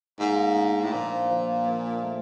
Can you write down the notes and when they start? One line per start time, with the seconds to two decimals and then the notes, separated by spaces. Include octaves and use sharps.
0.20 G#2 A#3
0.56 D4
0.84 A2
0.93 A#2 F3
1.30 F3
1.66 F3
2.02 A3